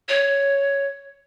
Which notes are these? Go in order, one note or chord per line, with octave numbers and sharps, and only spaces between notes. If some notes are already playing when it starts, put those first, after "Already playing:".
C#5